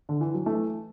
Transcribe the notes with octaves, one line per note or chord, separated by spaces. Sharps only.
D3
E3
F#3
E3 A3